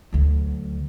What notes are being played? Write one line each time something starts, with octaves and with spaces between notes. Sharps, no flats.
D2 F#3